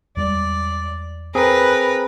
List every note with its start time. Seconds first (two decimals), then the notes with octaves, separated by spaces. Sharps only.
0.17 E2 G3 G#3 D5
1.35 C4 G#4 A#4 B4